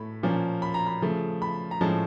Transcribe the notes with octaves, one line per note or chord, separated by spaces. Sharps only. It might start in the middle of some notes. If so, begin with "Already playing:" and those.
Already playing: A2 A3 B5
A#2 F3 A#3 C#4
B5
A#5
B5
C#3 F3 A3
B5
A#5
A2 F3 G#3 C#4 A5